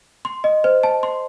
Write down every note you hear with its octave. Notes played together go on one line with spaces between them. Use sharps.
C6
D#5
C5
A5
C6